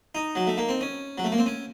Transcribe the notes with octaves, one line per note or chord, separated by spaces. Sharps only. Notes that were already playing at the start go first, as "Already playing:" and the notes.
D#4
F#3
A3
A#3
C4
C#4
F#3
A3
A#3
C4
C#4